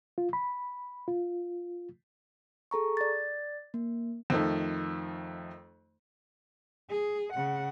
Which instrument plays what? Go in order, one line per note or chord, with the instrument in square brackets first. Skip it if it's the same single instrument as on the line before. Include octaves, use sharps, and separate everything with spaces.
[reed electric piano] F4
B5
F4
[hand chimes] G#4 A4 A#5 C#6
D5 A6
A#3
[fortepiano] F2 D#3 A3
[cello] G#4
C#3 F#5